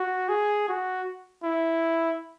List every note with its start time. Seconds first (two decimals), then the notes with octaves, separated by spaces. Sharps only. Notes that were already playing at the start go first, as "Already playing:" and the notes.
Already playing: F#4
0.29 G#4
0.68 F#4
1.44 E4